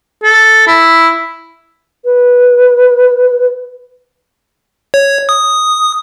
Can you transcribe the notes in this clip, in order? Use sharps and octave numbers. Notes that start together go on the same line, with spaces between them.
A4
E4
B4
C#5
D#6